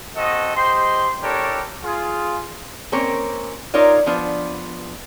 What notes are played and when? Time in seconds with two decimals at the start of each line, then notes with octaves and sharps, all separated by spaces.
0.16 C4 F#4 A4 D#5
0.55 G4 C5 D#5 C6
1.23 D4 E4 G4 A4 A#4 C#5
1.83 F4 G#4
2.92 A#3 C4 C#4 A#4 C#5
3.74 D#4 F4 A#4 C#5 D5
4.06 F3 B3 D4